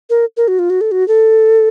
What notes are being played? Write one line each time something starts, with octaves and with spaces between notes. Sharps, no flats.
A#4
A#4
F#4
F4
F#4
A4
F#4
A4